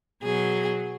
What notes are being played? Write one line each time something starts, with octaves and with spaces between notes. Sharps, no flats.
B2 F#3 G#4